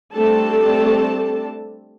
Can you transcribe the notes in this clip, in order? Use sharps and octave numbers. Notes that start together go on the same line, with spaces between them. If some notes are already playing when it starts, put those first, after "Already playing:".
G3 A3 C4 D4 A4 A5